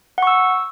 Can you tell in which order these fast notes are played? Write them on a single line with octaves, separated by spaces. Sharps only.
F#5 C#6 E6